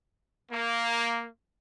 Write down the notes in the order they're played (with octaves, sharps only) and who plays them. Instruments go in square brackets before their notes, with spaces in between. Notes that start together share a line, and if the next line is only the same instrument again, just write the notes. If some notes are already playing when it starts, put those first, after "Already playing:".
[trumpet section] A#3